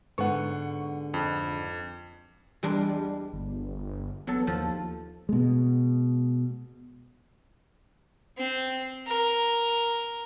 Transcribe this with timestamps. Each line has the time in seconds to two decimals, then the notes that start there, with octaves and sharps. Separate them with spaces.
0.18 G#2 D3 B3 F#5 C#6
1.14 F2
2.63 E2 G3 G#3 D4
3.33 G1
4.27 F#3 B3 A4
4.47 D#2 F3
5.29 B2 G#3
8.37 C4
9.07 A#4